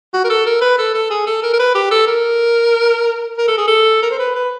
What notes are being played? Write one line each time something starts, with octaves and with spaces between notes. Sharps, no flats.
F#4
A#4
A4
A#4
B4
A4
A4
G#4
A4
A#4
A#4
B4
G4
A4
A#4
A#4
A4
G#4
A4
A#4
C5
B4
B4